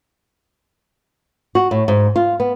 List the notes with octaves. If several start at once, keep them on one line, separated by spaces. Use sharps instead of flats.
F#4
A2
G#2
F4
B3